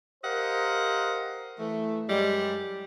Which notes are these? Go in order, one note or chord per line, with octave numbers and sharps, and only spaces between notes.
G4 A#4 C5 D#5 F5 F#5
E3 A3
F#2 G3 G#3